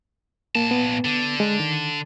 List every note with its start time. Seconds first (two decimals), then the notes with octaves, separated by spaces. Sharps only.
0.55 A#2 A#3 A5
0.71 B3
1.05 D3
1.40 G#3
1.60 D#3